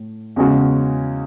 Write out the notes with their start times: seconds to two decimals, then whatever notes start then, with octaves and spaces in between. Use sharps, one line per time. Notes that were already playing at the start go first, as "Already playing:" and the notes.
Already playing: A2
0.36 E2 C#3 G#3 C#4 F#4